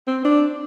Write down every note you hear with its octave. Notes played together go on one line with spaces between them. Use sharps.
C4
D4